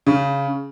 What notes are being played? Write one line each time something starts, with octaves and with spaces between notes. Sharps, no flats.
C#3